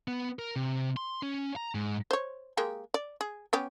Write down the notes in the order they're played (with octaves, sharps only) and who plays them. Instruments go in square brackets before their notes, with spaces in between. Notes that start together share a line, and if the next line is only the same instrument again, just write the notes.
[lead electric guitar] B3
A#4
C3
C6
C#4
A#5
G#2
[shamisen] C5 C#5
G#3 A#3 G4
D5
G#4
B3 C#4 G4